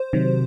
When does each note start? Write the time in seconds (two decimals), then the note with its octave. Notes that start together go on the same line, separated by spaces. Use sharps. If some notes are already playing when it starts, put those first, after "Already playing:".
Already playing: C5
0.13 C3 D#3 F#3